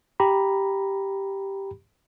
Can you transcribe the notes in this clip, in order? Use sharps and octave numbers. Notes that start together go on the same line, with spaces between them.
G4 A#5 B5